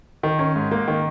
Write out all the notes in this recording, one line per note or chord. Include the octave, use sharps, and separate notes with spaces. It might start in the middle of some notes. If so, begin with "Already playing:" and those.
D#3
C#4
G#2
A#3
D#3